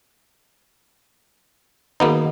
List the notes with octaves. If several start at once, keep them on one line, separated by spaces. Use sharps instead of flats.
D#3 A#3 B3 D#4 F#4 G#4